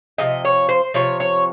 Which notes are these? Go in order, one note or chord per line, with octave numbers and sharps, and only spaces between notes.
C3 F3 D#5
C#5
C5
C3 F3 C#5
C#5